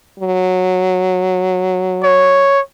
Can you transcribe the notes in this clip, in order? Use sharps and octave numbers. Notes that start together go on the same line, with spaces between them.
F#3
C#5